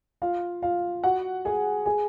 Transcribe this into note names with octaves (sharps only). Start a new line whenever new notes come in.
F4 F5
F4 F5
F#4 F#5
G#4 G#5
G#4 G#5